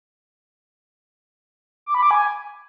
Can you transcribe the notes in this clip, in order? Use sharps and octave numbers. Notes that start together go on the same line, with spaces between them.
D6
B5
D6
G#5